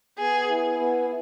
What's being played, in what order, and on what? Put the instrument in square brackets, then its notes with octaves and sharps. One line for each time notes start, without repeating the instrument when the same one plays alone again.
[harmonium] B3 [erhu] G#4
[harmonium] E4
B3